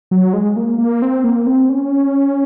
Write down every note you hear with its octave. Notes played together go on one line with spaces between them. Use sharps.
F#3
G#3
A#3
A#3
C4
A#3
C4
C#4